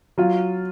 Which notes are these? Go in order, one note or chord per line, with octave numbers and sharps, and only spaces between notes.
F#3 F4